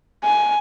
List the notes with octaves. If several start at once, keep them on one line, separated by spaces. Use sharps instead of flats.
G#5